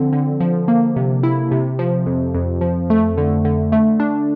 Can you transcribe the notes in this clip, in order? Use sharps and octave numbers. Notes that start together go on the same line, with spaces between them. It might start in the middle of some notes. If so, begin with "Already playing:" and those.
Already playing: D3 F3 C4
D3
F3
A#3
C3
E4
C3
F3
F2
F2
F3
A3
D3
D3
A3
D4